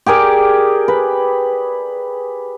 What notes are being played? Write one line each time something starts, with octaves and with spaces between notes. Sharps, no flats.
G4 G#4 A#4 D5
B4